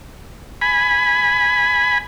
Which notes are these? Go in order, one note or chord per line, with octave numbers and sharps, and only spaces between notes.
G#5 B5